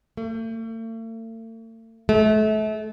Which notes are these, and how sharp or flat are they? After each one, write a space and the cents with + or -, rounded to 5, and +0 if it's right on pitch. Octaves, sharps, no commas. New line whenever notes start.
A3 +45
A3 -35